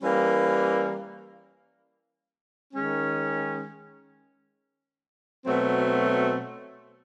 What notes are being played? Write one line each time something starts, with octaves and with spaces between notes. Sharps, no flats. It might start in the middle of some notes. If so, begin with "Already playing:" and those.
E3 G3 A#3 C#4
D#3 G#3 C#4
B2 F#3 A3 C4